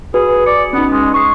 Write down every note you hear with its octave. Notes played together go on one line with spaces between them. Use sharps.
F#4 G#4 B4
D5 C#7
B3 C#4 D#4
G#3
G#3 C#6 C7